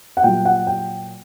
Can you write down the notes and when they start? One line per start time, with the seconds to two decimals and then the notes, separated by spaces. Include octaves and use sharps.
0.17 F#5
0.24 A#2 F#3 G5
0.45 F#5
0.67 G5